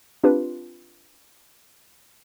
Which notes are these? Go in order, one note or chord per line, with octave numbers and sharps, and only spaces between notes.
C4 D4 F4 G4 B4